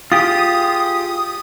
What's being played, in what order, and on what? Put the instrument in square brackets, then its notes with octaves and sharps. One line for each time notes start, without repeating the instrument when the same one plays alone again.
[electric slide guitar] F4 G4 G#4 [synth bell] D#6